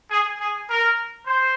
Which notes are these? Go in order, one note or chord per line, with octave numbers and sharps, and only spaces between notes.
G#4
G#4
A#4
C5